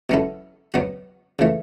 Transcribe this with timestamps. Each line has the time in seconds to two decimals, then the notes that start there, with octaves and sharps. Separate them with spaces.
0.10 B2 F#3 C#4 E4 A4
0.74 B2 F#3 B3 F#4
1.39 C#3 E3 A3